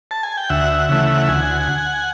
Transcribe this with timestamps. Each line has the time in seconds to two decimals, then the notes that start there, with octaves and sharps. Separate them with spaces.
0.11 A5
0.23 G#5
0.37 G5
0.49 D2 E5 F#5
0.89 C#3 E3 A3
1.28 D2 F#5 G#5